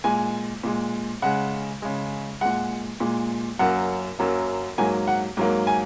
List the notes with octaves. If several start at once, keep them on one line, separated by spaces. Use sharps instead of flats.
A#2 G#3 G#5
A#2 G#3
C#3 G#3 F#5
C#3 G#3
A#2 G#3 F#5
A#2 G#3
F#2 F#3 A#3 F#5
F#2 F#3 A#3
G#2 F#3 A#3 G#5
F#5
G#2 F#3 A#3
G#5